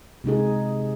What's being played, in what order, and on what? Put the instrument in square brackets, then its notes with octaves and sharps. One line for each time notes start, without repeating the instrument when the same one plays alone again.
[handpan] C3 G#3 D#4 G#4